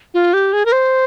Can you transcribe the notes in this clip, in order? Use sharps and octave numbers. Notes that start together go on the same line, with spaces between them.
F4
G4
G#4
A#4
C5